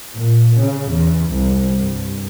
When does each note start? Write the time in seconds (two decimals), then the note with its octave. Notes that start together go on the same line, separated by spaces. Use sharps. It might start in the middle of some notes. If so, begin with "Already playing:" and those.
0.16 A#2
0.55 C#3
0.90 E2
1.33 C2
1.80 G2